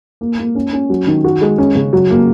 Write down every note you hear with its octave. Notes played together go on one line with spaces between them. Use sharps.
A#3
A#3
C#4
C#4
F#3
D#3
F#4
G#3
C#4
C#3
F#3
A#3